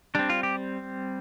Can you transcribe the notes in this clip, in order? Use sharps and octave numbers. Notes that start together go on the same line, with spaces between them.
G3 C4 D4
F4
G4